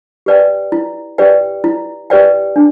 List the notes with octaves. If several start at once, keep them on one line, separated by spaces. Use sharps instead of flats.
G4 B4 D5 G5
E4
G4 B4 D5 G5
E4
G4 B4 D5 G5
D4